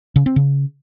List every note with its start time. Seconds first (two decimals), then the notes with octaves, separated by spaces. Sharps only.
0.16 C#3
0.26 C4
0.36 C#3